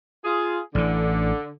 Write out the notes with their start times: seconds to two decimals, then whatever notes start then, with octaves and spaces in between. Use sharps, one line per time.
0.24 F4 G#4
0.75 A1 D3 E3